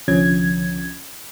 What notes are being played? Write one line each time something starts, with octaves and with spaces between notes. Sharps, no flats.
C2 D3 F3 C#4 G#6